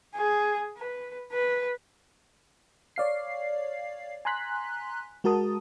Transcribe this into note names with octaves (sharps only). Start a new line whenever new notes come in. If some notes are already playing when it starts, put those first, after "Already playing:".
G#4
B4
B4
C#5 D5 F5 C7
G#5 A#5 C6 F#6 B6
G#3 F#4 A#4 A5 D#6